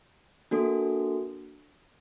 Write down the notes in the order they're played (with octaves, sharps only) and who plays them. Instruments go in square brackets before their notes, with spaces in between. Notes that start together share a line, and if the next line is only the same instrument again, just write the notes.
[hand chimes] A#3 D4 F#4 A4